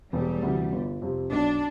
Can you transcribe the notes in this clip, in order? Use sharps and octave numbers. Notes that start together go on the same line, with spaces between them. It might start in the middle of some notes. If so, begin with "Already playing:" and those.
E1 G3
D2 C3 E3
G1
F2 C3 F3
B1 D4